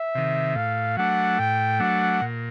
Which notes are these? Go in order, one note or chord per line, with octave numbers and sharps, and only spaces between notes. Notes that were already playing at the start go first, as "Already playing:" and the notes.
Already playing: E5
C3 D#3
A2 F5
F#3 A3 D4 F#5
A2 G5
F#3 A3 D4 F#5
A#2